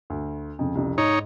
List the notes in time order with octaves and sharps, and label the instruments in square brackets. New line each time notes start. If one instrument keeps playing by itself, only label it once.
[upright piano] D2
F2 C#3
C2 F2 C#3
[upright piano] G#2 [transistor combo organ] D#4 C#5